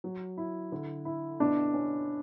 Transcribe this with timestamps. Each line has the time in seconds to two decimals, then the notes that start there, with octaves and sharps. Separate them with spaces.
0.04 F#3
0.37 E4
0.72 D3
1.05 E4
1.40 B2 D4
1.74 C#4